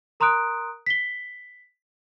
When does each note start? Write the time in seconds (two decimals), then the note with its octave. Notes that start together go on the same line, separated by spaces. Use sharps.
0.20 A#4 A#5 C6 D#6 F#6 D7
0.86 B6 C7 G7